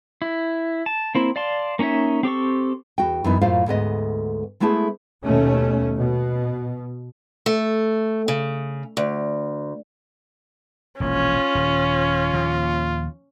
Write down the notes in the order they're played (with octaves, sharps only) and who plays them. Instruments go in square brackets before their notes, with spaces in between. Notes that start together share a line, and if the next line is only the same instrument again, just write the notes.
[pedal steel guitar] E4
A5
A#3 C4 E4
D5 F5 A5 C6
A#3 C#4 D#4 C#5 E5
C4 G4 A4 C#6
[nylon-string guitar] E2 F#4 G5
F#2 E3 B3 D#4
F#2 A2 A#3 F4 C5 F5
D2 G#2 B3 D#5
G#3 A3 B3 E4 G#4 A5
[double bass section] D#2 B2 A3 C#4
B2
[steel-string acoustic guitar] A3
C#3
D2
[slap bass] E1 A#1 [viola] C#4 [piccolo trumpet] F4
[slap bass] D#1
D#2 A#2 F3